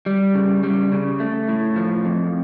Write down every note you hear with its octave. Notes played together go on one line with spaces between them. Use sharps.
G3
C#3
G3
C#3
A3
A2
F3
F2